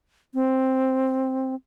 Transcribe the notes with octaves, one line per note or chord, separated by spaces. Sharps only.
C4